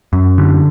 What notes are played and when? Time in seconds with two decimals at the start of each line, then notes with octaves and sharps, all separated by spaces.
0.13 F#2
0.38 D3